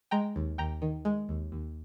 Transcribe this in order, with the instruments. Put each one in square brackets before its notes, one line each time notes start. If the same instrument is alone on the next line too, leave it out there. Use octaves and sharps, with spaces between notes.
[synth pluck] G#3 G5 A#5
D#2
D#2 G5 A#5
D#3
G#3
D#2
D#2